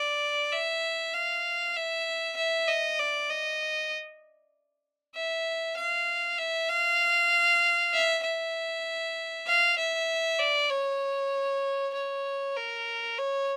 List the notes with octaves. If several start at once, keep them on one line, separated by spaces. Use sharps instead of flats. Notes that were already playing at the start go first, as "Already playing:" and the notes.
Already playing: D5
E5
F5
E5
E5
D#5
D5
D#5
E5
F5
E5
F5
E5
E5
F5
E5
D5
C#5
C#5
A#4
C#5